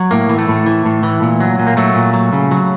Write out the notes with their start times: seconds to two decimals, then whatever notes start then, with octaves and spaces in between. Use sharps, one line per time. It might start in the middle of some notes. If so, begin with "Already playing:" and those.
Already playing: F#3
0.11 A2 A#3
0.29 E3
0.38 A3
0.48 A2
0.66 E3
0.86 A2
1.03 E3
1.22 A#2
1.40 F#3
1.59 A#2
1.67 A#3
1.77 F#3 A3
1.95 A#2
2.13 F#3
2.33 C#3
2.51 F#3